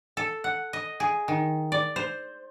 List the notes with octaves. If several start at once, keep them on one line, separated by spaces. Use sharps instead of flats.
A4
F#5
D#5
G#4
D#3
D5
C5